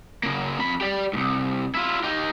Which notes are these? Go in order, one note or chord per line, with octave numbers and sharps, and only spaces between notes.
C#3 A#3
F2 B5
G4 D5
C2 G#2
E4 F4
D#4 G4